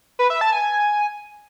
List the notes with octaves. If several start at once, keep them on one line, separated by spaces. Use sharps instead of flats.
B4
E5
A5
G#5